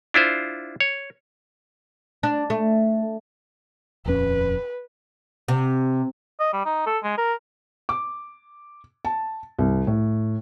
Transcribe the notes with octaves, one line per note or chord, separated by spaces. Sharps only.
D4 E4 F4 C5
C#5
D4
A3
D#1 F2 C#4 B4
C3
D#5
G3
D#4
A4
G#3
A#4
D6
A5
C2
A2